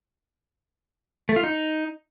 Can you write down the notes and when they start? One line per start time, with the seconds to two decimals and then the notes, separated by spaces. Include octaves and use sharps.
1.29 A3
1.36 F4
1.44 D#4